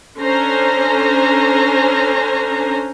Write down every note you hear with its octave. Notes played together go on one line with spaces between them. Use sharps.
C#4 D4 A4 C5 G#5 A#5